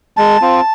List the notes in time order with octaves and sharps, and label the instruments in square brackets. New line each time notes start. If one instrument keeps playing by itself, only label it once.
[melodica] G#3 A5
C4 F4